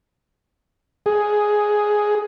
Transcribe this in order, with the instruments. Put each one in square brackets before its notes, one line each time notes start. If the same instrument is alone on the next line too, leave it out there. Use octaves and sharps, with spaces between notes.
[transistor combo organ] G#4